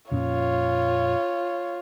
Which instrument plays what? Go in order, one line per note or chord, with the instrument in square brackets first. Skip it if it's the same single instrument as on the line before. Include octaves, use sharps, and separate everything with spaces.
[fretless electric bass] F2 A#2 C#4 [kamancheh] F4 C#5